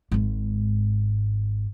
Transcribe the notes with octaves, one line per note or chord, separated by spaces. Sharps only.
G#1 G#2